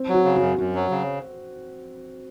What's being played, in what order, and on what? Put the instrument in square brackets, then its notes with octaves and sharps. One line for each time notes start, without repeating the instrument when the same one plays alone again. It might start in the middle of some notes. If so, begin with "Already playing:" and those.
Already playing: [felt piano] C4
[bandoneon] F#3
[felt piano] F#4
[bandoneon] C#3
[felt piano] F#4
[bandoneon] F#2
[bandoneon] F#2 [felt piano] F#4
[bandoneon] F#3
C#3